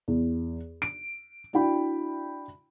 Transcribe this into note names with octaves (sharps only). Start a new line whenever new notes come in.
E2
D7
D4 E4 F#4 G5 B5